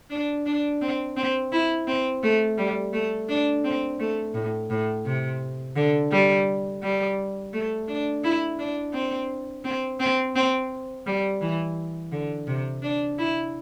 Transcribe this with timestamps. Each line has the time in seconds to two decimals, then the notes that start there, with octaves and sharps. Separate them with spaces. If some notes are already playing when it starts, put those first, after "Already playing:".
0.10 D4
0.46 D4
0.81 C4
1.17 C4
1.52 E4
1.87 C4
2.23 A3
2.58 G3
2.93 A3
3.29 D4
3.65 C4
4.00 A3
4.34 A2
4.70 A2
5.05 C3
5.76 D3
6.12 G3
6.83 G3
7.53 A3
7.88 D4
8.24 E4
8.59 D4
8.93 C4
9.65 C4
10.00 C4
10.36 C4
11.06 G3
11.41 E3
12.12 D3
12.47 C3
12.82 D4
13.19 E4